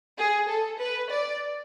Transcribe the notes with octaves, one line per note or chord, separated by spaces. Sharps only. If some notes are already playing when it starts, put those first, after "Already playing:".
G#4
A4
B4
D5